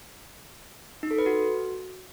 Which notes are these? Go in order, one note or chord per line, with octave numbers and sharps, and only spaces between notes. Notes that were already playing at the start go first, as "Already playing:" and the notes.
D#4
A4
B4
F#4